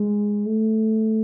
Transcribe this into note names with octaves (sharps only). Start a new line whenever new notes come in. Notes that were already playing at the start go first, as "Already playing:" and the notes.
Already playing: G#3
A3